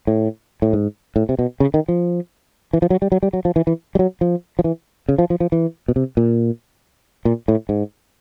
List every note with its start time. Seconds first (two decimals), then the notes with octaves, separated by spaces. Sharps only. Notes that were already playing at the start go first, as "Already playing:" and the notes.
0.07 A2
0.62 A2
0.73 G#2
1.16 A2
1.29 C3
1.39 B2
1.60 C#3
1.74 D#3
1.88 F3
2.73 E3
2.82 F3
2.90 F#3
3.02 G3
3.12 F#3
3.23 G3
3.33 F#3
3.45 F3
3.56 E3
3.67 E3
3.95 G3
3.99 F#3
4.21 F3
4.59 F3
4.64 E3
5.09 C#3
5.18 F3
5.30 F3
5.40 F3
5.52 E3
5.88 B2
5.96 C3
6.17 A#2
7.25 A#2
7.48 A2
7.69 G#2